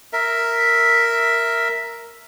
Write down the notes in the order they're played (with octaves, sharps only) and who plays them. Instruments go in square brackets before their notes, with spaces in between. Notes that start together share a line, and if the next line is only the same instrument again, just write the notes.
[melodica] A#4 E5